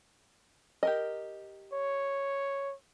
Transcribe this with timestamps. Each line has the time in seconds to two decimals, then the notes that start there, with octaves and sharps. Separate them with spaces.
0.83 G4 A#4 D#5
1.73 C#5